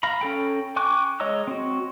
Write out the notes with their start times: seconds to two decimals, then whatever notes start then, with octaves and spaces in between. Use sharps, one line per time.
0.03 F5 A#5 B5
0.21 C#4 A4 G5
0.76 G5 G#5 C#6 D6 F#6
1.20 G#3 C#5 D#5 A#5 E6
1.47 C4 F#4